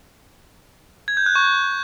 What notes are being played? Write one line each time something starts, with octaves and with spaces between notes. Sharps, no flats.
G#6
G6
F#6
C#6